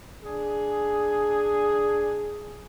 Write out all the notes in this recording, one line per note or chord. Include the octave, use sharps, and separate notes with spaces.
D4 G#4